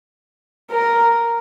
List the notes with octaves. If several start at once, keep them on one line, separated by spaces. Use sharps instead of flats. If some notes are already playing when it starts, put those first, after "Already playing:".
A#4